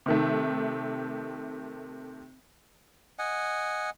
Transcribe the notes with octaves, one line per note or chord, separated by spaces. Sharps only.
C3 D#3 A3
D#5 F#5 G#5